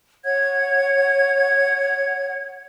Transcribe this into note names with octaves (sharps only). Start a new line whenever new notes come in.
C#5 F#5 G#6